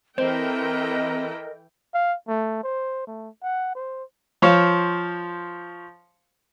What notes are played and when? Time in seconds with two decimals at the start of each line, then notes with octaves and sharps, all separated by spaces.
0.18 E3 C4 A4 A#4 C5 D#5 G5
1.94 F5
2.28 A3
2.63 C5
3.07 A3
3.43 F#5
3.75 C5
4.42 F3 C5 C#5 F5